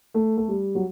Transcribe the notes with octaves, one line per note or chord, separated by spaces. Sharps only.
A3
A3
G3
F#3